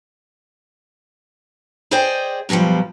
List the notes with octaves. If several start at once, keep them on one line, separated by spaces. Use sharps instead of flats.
G#4 C5 D5 D#5 G5 G#5
F#2 B2 D#3 F3 G3